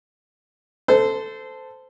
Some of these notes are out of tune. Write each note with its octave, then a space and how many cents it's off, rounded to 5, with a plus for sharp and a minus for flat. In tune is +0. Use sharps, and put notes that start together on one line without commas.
A4 +0 C5 -20